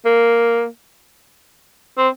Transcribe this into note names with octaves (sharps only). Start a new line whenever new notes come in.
A#3
C4